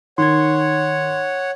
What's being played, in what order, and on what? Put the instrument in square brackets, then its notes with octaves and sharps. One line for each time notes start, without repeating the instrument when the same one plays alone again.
[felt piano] D#3 [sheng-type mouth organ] C#5 F#5 [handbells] C6 G#6